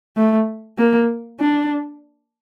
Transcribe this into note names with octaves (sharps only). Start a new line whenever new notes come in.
A3
A#3
D4